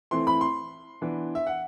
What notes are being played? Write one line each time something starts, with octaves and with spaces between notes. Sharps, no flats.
E3 A3 C4 E4 C6
B5
C6
E3 B3 D4
E5
F#5